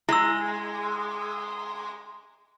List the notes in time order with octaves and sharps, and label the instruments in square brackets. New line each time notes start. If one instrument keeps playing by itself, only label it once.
[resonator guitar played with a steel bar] G#3 [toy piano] E4 E6